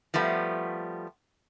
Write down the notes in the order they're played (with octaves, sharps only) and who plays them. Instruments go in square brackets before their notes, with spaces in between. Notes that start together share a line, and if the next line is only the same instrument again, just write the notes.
[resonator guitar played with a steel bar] F3 G3 A3 B3